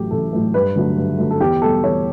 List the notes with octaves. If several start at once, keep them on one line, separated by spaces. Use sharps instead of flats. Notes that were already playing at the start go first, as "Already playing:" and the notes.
Already playing: A1 A2 F#3 A3 G4
A1 A4
A2 F#3 A3
G2 B4
D3 F#3 A3
G2
D3 F#3 A3
A4
E2 G4
B2 G3 A4
E2 C#5